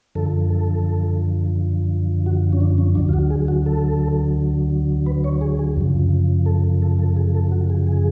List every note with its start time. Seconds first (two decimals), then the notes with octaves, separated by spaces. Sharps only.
0.15 F#2 D3 F3 A4
0.50 A4
2.26 F#4
2.53 C#4
2.61 D4
2.78 C#4
2.95 D2 D3 F#3 D4
3.09 F4
3.13 F#4
3.30 G#4
3.48 F#4
3.66 A4
5.06 B4
5.24 C#5
5.41 G#4
5.59 G#4
5.77 F#2 C#3 F3
6.46 A4
6.82 A4
6.99 A4
7.16 G#4
7.35 A4
7.52 F#4
7.70 G#4
7.87 G#4